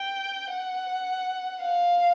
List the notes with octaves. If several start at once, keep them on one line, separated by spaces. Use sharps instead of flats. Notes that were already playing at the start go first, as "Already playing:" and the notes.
Already playing: G5
F#5
F5